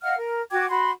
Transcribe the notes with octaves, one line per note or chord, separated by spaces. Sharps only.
D#5 F5 F#5 F6
A#4
F#4 G5 D6 G#6
F#4 B5 C6